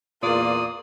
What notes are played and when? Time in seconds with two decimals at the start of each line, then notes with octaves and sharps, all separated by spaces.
0.23 E2 A#2 A#3 F4 D5 D#6